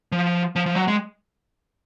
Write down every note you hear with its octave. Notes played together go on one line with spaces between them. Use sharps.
F3
F3
F3
F#3
G#3